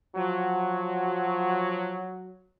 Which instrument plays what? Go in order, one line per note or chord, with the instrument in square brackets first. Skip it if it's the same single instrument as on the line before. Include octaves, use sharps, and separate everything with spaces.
[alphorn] F3 [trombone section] F#3